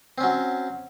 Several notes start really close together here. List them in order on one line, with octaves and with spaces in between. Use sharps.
C4 C#4 F#3